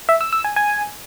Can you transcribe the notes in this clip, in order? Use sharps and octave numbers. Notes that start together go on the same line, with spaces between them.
E5
E6
E6
G#5
G#5